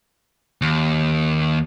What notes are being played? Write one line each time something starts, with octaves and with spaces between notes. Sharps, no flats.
D#2